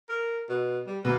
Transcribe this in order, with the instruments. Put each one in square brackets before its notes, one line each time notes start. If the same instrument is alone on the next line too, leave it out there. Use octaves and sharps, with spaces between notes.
[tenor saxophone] A#4
B2
G3
[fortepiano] B2 A#3 [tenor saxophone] B4